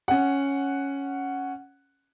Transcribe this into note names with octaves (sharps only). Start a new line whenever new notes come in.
C#4 F#5